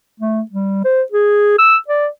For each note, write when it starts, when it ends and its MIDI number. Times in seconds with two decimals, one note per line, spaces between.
0.20 0.42 57
0.51 0.84 55
0.85 1.02 72
1.12 1.55 68
1.59 1.77 88
1.88 2.07 74